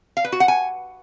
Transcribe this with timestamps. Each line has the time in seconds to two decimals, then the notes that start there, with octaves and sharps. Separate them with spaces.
0.17 F5
0.25 B4
0.32 F#4
0.40 F#5
0.48 G#5